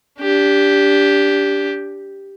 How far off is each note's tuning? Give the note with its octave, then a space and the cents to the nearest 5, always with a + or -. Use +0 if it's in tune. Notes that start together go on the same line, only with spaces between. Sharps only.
D4 -25 G4 +0